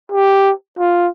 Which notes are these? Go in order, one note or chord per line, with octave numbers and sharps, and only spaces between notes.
G4
F4